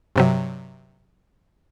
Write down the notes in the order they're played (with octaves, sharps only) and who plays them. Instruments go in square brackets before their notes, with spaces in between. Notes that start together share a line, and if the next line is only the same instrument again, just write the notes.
[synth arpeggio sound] G2 C3 F#3